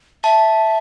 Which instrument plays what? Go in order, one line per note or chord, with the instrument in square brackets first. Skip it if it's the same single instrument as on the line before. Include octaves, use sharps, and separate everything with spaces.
[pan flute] E5 [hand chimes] A5